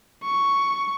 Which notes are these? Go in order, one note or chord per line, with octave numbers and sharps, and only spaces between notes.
C#6